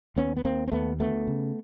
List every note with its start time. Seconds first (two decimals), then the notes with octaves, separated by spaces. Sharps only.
0.16 D#2 B3 C#4
0.36 B3
0.44 D#2 A#3 C4
0.68 C4
0.72 D#2 A3 B3
1.00 D2 A3 B3
1.27 C#3